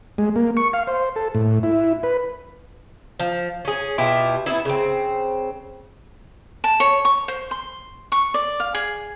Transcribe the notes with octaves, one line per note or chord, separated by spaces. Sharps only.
G#3
A#3
C#6
F5
C5
A4
A2
E4
B4
F3
C#4 G#4
B2 E4 F4 G4
B3 D#4 E4
C#3 C4
A5
C#5
C#6
C5
C6
C#6
D5
F5
G#4